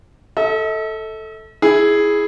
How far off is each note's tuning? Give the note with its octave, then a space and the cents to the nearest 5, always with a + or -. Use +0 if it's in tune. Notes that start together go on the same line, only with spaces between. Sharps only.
A4 +0 D#5 +45
E4 -5 G#4 +0